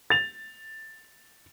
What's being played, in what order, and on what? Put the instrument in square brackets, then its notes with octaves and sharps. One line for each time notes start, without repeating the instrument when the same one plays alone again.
[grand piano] A6 F7